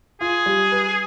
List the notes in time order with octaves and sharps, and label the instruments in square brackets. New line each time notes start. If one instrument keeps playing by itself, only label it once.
[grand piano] F4 [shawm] G#4
[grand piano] G3
B4